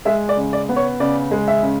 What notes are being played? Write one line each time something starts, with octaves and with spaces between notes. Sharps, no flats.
G#3 E5
D5
C#3
D5
B3
C#5
C#3 D5
G#3
E5
C#3